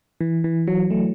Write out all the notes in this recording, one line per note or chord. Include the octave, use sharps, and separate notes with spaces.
E3
E3
F#3
A3